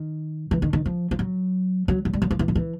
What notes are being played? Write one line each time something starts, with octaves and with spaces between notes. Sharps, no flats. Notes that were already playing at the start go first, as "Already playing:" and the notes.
Already playing: D#3
E3
D#3
D#3
F3
F3
F#3
F#3
F#3
G3
F#3
F3
E3
F3
E3